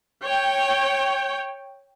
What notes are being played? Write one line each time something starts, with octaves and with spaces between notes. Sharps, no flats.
C#5 G5